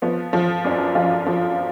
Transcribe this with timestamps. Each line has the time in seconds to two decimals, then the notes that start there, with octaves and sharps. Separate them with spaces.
0.02 F3 B3
0.33 F3
0.65 F#2 D4
0.95 F3 F4
1.26 F3